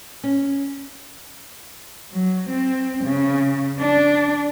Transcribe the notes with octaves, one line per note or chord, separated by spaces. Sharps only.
C#4
F#3
C4
C#3
D4